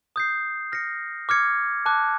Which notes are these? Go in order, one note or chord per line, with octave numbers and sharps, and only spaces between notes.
D#6 G6 C7
F6 A#6 C#7
D6 F6 G#6 C#7
A5 D6 F#6